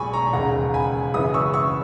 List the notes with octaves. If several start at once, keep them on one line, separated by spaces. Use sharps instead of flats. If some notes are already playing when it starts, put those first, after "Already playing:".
Already playing: B1 A#2 G#3 G#5 B5 C#6
A#5 C#6
E1 D#2 C#3 F#5 A#5
G#5 B5
F#1 F#2 E3 G#3 B5 D#6
C#6 E6
C#6 E6